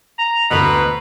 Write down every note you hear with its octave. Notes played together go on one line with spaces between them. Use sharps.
A#5
D2 B2 D3 B4 A#5